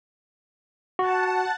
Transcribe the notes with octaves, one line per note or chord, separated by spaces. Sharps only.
F#4 F#5 A5